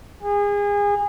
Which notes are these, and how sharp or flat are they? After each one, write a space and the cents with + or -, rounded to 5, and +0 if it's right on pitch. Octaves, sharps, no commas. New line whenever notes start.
G#4 -30